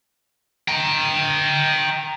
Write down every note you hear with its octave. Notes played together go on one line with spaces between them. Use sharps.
G5 A#5